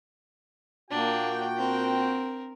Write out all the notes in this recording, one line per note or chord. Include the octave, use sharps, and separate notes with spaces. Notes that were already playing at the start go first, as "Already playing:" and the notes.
A#2 A#3 D4 F#4 G5
C4 A#4